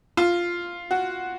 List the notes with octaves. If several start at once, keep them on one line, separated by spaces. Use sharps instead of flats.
F4
F#4